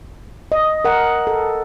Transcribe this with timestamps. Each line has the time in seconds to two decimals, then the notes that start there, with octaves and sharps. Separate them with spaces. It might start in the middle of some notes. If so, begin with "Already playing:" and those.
0.52 D#5
0.85 A#4 F#5
1.27 A4